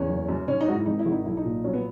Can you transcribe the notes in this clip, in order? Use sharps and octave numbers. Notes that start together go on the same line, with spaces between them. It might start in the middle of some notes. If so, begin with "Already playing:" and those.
Already playing: E2 C#4
F#1
F#2
D#3 C#4
D#4
G#2 F#4
E4
G#1 D#4
E4
G#1
D#4
B1 E4
D#4
A#2
F#3 C#4
B3